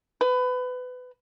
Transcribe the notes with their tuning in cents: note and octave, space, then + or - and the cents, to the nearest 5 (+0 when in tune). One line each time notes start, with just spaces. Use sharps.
B4 +25